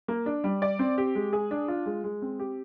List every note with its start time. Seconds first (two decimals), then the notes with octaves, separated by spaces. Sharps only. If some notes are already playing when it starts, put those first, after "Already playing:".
0.08 A#3
0.26 D4
0.44 G3
0.62 D5
0.79 C4
0.98 G4
1.15 G#3
1.33 G#4
1.51 D4
1.68 F4
1.86 G#3
2.04 G#3
2.22 C4
2.39 G4